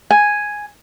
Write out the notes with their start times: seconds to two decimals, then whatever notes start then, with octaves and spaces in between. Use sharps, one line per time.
0.11 G#5